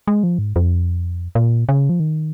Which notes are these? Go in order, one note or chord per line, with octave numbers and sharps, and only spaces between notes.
G#3
F3
G#2
F2
A#2
C#3
F3
D#3